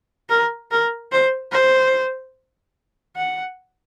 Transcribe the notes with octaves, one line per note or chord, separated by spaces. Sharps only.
A#4
A#4
C5
C5
F#5